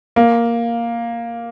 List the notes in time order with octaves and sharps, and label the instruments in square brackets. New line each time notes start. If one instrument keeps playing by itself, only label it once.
[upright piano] A#3